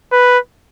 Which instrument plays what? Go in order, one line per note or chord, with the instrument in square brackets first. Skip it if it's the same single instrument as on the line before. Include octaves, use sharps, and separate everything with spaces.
[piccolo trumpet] B4